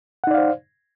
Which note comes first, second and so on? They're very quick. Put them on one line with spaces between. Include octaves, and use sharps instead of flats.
F#5 D#4 D5 F5 C5